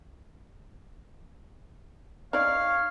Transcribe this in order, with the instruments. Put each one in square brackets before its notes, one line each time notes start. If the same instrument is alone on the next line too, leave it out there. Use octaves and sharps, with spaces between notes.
[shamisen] D#4 D5 [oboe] C#5 [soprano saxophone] F5 [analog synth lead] F6